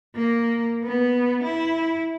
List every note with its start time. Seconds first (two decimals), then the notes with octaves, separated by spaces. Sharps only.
0.15 A#3
0.84 B3
1.44 E4